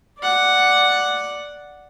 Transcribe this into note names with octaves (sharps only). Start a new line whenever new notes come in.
D5 F#5